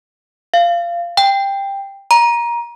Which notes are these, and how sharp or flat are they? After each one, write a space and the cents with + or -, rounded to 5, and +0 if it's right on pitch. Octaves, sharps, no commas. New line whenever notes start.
F5 -20
G5 +10
A#5 +20